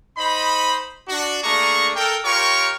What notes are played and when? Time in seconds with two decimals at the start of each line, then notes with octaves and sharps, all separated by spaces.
0.17 D#4 C5 D#5 B5
1.08 D4 F#4
1.44 A3 A#3 D4 G#4 A#5 C#6
1.96 A4 A#4 G5
2.25 F4 G4 A#4 C#5 C#6